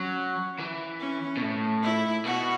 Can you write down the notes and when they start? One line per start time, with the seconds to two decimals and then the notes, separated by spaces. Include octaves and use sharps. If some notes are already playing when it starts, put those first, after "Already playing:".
Already playing: F#3 C#4
0.59 E3
1.00 C#4
1.37 B2
1.42 A2
1.83 E4
2.25 B2 F#4